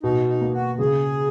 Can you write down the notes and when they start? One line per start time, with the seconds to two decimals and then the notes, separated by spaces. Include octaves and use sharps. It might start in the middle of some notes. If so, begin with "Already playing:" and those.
0.03 B2 D#4
0.28 D#4
0.41 A#3
0.54 F#4
0.79 C#3 G#4